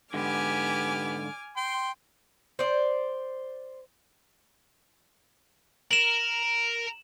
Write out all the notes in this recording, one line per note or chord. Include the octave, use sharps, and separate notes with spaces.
G#2 D3 B3 G4 G#5 D6 F6
G5 C6
C5 D5
A#4 E7 F#7